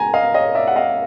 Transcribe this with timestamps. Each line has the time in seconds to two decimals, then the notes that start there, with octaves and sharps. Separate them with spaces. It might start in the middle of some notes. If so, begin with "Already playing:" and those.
Already playing: C#2 G#5 A#5
0.14 D#5 F5
0.34 C#5 D#5
0.55 D5 E5
0.67 F#5
0.76 D#5 F5